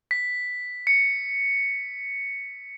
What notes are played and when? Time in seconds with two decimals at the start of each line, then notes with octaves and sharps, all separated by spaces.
0.11 B6
0.87 C#7